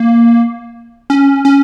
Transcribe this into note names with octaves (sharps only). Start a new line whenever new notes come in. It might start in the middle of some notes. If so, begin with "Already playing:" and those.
Already playing: A#3
C#4
C#4